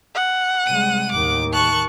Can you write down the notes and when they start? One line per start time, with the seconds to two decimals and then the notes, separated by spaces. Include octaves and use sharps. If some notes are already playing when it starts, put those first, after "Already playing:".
0.15 F#5
0.66 C3 G3 G#3 D#7
1.12 D#2 A2 D#3 D6
1.53 A5 C#6 F#6